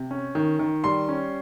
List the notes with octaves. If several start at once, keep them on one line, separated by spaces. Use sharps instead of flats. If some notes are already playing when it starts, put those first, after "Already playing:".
Already playing: C3
C#4
D#3
D#3
G3 C6
C#4